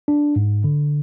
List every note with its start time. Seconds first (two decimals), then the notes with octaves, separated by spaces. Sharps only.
0.08 D4
0.36 G#2
0.64 D3